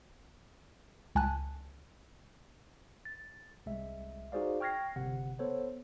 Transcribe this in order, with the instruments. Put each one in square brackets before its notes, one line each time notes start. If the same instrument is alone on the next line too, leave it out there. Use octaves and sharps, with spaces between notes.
[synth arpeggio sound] C#2 G#5 A5 F#6
[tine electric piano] A6
C2 G#3 E5
D#4 F#4 G#4 C5 D5 F5
G5 C#6 F6 G#6 A#6 C7
G1 C3 F#5
B3 A4 C5 C#5